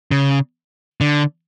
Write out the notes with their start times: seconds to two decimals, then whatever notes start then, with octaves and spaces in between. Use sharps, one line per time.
0.11 C#3
1.01 D3